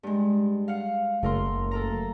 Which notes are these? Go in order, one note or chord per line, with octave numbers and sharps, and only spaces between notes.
G2 G#3
F5 F#5
F#1 A3 A#4 C6
A4 A#4 A#5